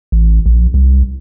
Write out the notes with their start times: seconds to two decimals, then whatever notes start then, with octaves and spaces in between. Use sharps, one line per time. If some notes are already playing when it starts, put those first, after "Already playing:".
0.12 A1
0.46 A#1
0.74 C2